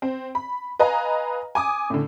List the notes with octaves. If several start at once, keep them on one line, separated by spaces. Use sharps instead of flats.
C4
B5
B4 D#5 F5 G#5 A#5
G#5 D6 D#6
A2 D3